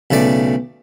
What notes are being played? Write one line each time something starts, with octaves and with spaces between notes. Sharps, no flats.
B1 C#3 A3 D5